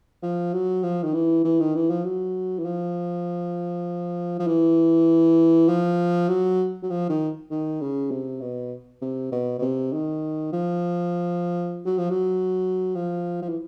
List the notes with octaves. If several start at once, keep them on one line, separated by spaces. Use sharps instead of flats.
F3
F#3
F3
D#3
E3
E3
D#3
E3
F3
F#3
E3
F3
F3
E3
F3
F#3
F#3
F3
D#3
D#3
C#3
C3
B2
C3
B2
B2
C3
D#3
F3
F#3
F3
F#3
F3
F3
E3